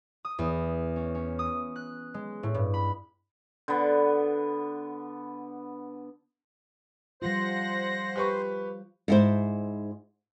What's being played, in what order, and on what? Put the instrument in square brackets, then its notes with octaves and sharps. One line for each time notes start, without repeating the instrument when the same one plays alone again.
[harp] D#6
E2
C#4
C#4
D#6
F#6
G#3
A2
G2
B5
[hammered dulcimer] D3 B3
[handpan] F3 G3 F4 [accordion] C5 [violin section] F#5 A#6
[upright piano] G4 B4 C#6
[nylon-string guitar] G#2 E4 C5